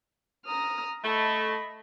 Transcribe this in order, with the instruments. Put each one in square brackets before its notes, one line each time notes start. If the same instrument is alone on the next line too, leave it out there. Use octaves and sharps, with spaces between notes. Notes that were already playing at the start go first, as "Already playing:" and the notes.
[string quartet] A#5 D#6 F6
[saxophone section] A3 [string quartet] D#5 B5